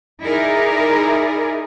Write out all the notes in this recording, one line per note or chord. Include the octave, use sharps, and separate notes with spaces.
D#4 E4 G#4 A#4 D5